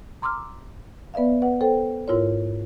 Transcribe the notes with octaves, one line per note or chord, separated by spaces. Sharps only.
A#5 C6 D6 E6 F6
B3 B4 D5 E5 F5
B4 F#5
A4 C5 G5
G#2 E4 F4 A#4 C#5